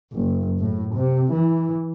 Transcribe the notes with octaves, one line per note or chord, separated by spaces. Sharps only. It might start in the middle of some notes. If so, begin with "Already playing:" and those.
F#1
A2
C3
E3